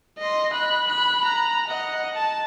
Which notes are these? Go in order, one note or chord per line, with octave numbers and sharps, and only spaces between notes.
D#5 C6
B5 F#6
B5 F#6
A#5
D#5 F#5
A5